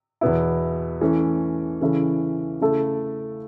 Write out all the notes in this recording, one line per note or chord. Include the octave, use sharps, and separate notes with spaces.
E2 B2 B3 E4
E3 A3 C#4
C#3 E3 C#4 E4 A4
C#3 A3 E4 A4